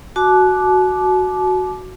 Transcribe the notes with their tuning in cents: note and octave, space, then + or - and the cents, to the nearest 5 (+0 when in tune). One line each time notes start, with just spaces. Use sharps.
F#4 +0 A5 -40 D6 +0